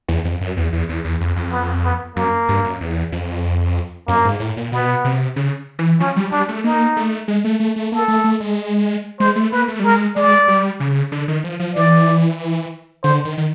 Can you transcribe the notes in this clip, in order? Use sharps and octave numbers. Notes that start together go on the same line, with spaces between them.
E2
F2
F#2
E2
E2
E2
E2
F2
F2
B3
B3
F#2 A#3
G2
F#2
E2
F2
F#2 A#3
G#2
A2
A#2
B2 B3
C3
C#3
E3
F3 C#4
G3
G3 D4
A3
A#3 D#4
A3
G#3
A3
A3
A3
A#3 A4
A3
A3
G#3
G#3 C5
A3
A#3 B4
A3
G3
G#3 A#4
G#3 D5
G3
C#3
D3
D#3
F3
F3
E3 D5
D3 C5
D#3
D#3